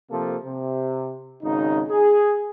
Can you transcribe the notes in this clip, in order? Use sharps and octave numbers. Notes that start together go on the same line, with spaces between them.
C3 F3 A#3 A4
C3
G#1 C#3 D#4
G#4